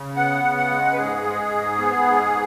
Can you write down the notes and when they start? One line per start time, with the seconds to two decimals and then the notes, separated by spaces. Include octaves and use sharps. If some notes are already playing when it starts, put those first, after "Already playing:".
Already playing: C#3
0.16 B3 F#5
0.44 C#3
0.57 F#5
0.71 G#3
0.92 B4
0.97 G#2 G#4
1.25 G#3
1.52 G#2
1.78 B3
2.06 G#2